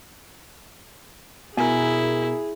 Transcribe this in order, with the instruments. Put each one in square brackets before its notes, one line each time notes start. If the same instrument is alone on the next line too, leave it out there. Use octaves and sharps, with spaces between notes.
[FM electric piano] B2 A#4 [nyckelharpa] E4 [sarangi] G#4 [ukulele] G#5